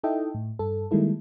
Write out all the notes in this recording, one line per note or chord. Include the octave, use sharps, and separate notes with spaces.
D#4 E4 A4 D#5 E5 G5
A2
G2 A4
D#3 G3 G#3 A#3 E4 A4